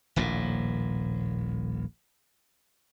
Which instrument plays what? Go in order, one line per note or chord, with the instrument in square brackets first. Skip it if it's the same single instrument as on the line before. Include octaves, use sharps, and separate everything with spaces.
[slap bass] D#1 A#1 A2